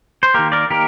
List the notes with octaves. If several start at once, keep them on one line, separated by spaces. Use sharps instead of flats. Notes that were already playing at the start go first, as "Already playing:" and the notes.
C5
D#3 A#3 G4 A#4
A#4 D5
D#3 A#3 G4 A#4